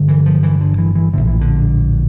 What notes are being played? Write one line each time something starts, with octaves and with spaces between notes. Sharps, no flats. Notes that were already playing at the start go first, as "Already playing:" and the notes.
Already playing: G1 G2 D3
E3
F3
E3
D3
E3
E3
A#1 A2 D3
E3
D3